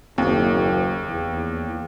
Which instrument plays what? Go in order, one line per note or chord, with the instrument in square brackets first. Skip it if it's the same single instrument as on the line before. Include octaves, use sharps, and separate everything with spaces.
[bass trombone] F#1 [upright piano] D#2
[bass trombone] E2